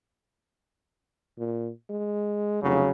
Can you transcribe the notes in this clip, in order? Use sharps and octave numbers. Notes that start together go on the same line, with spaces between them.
A#2
G#3
F1 C#3 F#3